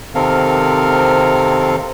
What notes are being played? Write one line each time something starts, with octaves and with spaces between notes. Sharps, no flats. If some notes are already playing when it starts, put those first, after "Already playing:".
C3 D#3 C4 A4 A#4 F5